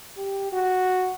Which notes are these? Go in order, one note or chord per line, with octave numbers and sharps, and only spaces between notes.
G4
F#4